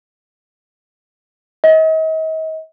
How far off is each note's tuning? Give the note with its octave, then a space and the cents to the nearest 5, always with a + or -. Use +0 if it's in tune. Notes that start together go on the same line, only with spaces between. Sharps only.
D#5 +40